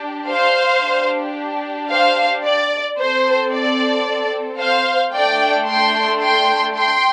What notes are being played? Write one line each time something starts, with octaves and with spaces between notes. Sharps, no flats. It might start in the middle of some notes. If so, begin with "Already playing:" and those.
Already playing: D4 G4
C5 F5
D4 G4
C5 F5
D5
C4 A4 C5
D5
C5 F5
A3 D4 A4 D5 G5
G5 C6
G5 C6
G5 C6